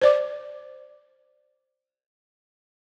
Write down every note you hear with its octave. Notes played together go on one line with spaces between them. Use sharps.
C5 D5 D6